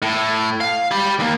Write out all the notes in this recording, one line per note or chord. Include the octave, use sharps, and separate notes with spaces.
A2
F5
G4 B5
D#2 A#3